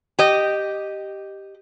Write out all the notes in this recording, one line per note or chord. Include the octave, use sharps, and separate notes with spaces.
G4 D#5